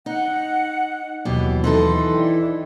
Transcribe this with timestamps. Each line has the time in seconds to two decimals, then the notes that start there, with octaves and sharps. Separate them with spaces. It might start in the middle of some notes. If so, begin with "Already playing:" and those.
0.06 D#4 F#5
1.25 D#2 B2 E3 F#3 G4
1.64 E3 D#4 A4 C6
2.15 E4 D5 G5